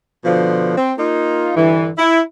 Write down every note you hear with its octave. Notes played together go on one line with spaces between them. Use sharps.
B2 D3 F3
C4
A#3 D#4 F4
G2 D3 E3
E4